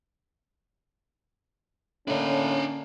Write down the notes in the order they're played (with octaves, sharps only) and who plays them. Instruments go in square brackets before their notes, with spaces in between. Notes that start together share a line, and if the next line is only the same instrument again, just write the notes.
[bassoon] A2 [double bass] D3 A#3 [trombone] C#4 [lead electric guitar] D4 D#5